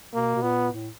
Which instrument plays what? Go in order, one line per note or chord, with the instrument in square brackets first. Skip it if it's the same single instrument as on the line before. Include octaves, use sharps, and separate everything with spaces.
[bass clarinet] B2 [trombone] A#3
[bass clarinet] B2
[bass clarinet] A#2 [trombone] B3
[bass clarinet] A2